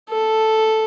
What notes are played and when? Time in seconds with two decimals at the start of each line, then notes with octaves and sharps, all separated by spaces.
0.10 A4